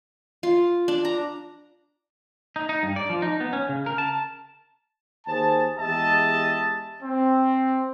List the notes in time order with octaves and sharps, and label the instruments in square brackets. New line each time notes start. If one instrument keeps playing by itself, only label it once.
[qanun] F4
D4
A#5
[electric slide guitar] D#4
D#4
G2
D5
F3
D#4
B3
C#4
C#3
A#4
A5
[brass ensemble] D#2 G#4 C5 A5
E2 G#3 G4 D#5 E5 A5
C4